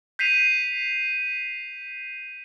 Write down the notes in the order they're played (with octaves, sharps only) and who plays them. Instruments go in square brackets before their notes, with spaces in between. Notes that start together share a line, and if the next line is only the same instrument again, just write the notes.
[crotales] G6 B6 C7 D#7 F7